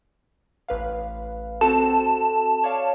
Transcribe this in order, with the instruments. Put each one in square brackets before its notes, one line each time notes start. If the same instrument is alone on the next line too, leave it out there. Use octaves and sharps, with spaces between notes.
[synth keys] A1 B4 F5
[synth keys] C4 F#4 A4 [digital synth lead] A5
[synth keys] C#5 D5 F5